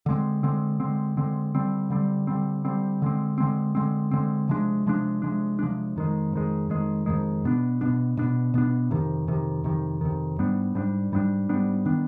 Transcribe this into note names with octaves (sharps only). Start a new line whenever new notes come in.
D3 G#3 C4
D3 G#3 C4
D3 G#3 C4
D3 G#3 C4
D3 G3 C4
D3 G3 C4
D3 G3 C4
D3 G3 C4
D3 G#3 C4
D3 G#3 C4
D3 G#3 C4
D3 G#3 C4
C3 F3 G#3 D4
C3 F3 G#3 D4
C3 F3 G#3 D4
C3 F3 G#3 D4
F2 D#3 G#3
F2 D#3 G#3
F2 D#3 G#3
F2 D#3 G#3
B2 B3 D4
B2 B3 D4
B2 B3 D4
B2 B3 D4
F2 C3 D#3
F2 C3 D#3
F2 C3 D#3
F2 C3 D#3
G#2 G3 B3 D4
G#2 G3 B3 D4
G#2 G3 B3 D4
G#2 G3 B3 D4
D#3 B3 D4